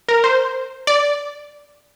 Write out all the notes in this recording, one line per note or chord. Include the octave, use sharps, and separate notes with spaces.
A#4
C5
D5